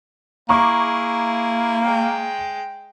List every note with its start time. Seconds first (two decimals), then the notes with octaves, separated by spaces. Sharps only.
0.49 A#3 E4 G#4 A#5 C#6 D6
1.83 G#3 G5